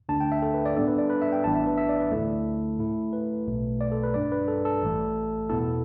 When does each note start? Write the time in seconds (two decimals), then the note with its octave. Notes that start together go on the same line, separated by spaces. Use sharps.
0.09 D2 D3 A3 D4 A5
0.20 G5
0.32 E5
0.42 A4
0.54 B4
0.66 D5
0.76 A2 G3 B3 D4 A4
0.88 B4
0.98 D5
1.10 B4
1.22 E5
1.32 G5
1.44 A1 A2 E3 B3 D4 A5
1.55 E5
1.67 B4
1.78 E5
1.89 D5
2.00 B4
2.12 D2 D3 A3 E4 A4
2.79 A2 A3 E4
3.13 B4
3.47 B1 B2 A3
3.81 D5
3.92 A4
4.03 B4
4.14 G2 G3 D4 D5
4.32 B4
4.48 A4
4.65 A4
4.82 A1 A2 E3 A3
5.49 E2 B2 B3 E4 A4